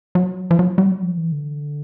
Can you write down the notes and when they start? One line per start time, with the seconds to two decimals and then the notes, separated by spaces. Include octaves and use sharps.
0.15 F#3
0.51 F3
0.59 F#3
0.78 G3
0.90 F#3
1.03 F3
1.17 E3
1.32 D3